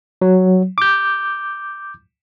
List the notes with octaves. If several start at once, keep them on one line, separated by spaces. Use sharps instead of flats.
F#3
D6 G6